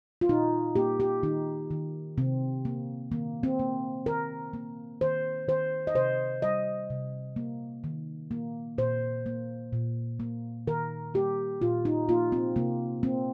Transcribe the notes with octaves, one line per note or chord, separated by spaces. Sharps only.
F4
A#2 D#4
A#3 G4
G4
D#3 D#4
D#3
C3 C4
A#3
D#3 A#3
C4
A#3
D#3 A#4
A#3
D#3 C5
D#3 C5
D#5
C3 C5
G3 D#5
C3
A#3
D#3
A#3
A#2 C5
A#3
A#2
A#3
D#3 A#4
A#3 G4
A#2 F4
D#4
A#3 F4
C4
C3 A#3
A#3 C4